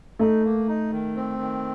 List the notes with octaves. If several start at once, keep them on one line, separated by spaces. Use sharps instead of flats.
A3 D#4
A#3
D#4
D#3
C4
D#3